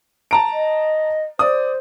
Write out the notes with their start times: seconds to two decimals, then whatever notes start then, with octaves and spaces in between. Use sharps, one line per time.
0.31 A5 A#5 D7
0.53 D#5
1.39 C5 D5 D#6